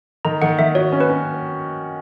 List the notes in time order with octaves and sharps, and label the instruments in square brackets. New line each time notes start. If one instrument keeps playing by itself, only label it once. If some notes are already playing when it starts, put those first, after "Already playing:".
[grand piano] D#3 [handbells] A#5
[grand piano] D#3 [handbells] F#5
[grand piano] D#3 [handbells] E5
[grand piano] F#4 [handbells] C#5
[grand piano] C#4
[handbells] B4
[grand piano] C#4